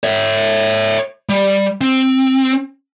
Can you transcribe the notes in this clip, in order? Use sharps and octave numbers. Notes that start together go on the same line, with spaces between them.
C#5 E5
G3
C4